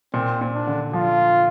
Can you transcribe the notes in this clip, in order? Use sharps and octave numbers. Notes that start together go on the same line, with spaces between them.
A#2 C4
A#2
D4
D3
F3 F4